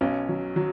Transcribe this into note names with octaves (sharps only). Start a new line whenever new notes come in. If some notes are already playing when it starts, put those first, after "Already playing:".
B1 C#4
F#3
F#3